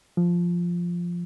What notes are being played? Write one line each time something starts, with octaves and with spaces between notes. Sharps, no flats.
F3